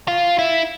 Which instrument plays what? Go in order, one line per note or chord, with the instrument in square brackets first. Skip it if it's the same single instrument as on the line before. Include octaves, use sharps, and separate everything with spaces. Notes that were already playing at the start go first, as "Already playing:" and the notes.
[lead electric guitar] F4
E4